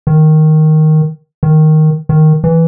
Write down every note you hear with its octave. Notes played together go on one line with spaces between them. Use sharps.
D#3
D#3
D#3
E3